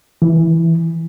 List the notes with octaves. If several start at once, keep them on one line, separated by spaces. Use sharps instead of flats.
E3